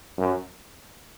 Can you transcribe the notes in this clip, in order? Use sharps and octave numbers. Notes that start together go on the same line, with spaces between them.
F#2